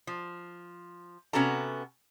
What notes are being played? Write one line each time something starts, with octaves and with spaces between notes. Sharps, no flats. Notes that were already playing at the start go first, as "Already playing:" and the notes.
F3
C3 B3 C#4 F#4 A4 A#5